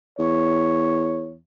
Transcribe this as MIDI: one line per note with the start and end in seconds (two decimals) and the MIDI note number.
0.19 1.39 40
0.19 1.34 73